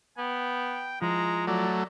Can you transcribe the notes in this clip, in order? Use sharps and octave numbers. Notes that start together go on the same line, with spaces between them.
B3 G5
F3 G#3 E4 F4 A#5
F#3 A3 D5 A#5